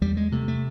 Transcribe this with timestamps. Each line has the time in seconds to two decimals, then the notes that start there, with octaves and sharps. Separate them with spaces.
0.01 E2 G3
0.17 G#3
0.32 C3 A3
0.48 A3